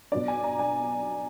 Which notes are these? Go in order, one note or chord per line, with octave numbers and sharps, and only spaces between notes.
B2 F#3 B3 D4 D5
G#5
A#5
G#5